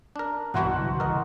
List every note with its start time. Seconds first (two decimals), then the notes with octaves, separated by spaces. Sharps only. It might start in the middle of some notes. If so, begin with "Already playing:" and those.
0.16 D4 A#4
0.54 B1 G2 B2 E3 F#4 C5 F#5
0.74 B1 C#3 F#3
1.00 G1 C#3 A#4 D#5